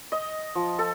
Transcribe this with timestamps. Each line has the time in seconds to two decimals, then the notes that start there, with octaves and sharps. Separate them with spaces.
0.12 D#5
0.55 F3
0.79 A4